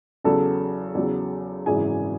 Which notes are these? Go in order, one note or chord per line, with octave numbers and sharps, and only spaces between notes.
E2 C#3 F#3 A4 A5
E2 C#3 F#3
G#1 F#2 C#3 E3 G#4 G#5